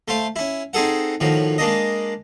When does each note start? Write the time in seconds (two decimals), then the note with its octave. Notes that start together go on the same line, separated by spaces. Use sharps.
0.08 A3 C5 F5
0.36 C#4 E4
0.73 C4 D#4 G#4 A4 F#5
1.20 A2 D#3 F3 F#3
1.58 G#3 A#3 D4 D#5